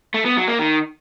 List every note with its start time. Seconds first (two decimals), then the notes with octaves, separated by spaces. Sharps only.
0.14 A3
0.25 B3
0.37 F#3
0.48 A#3
0.59 D#3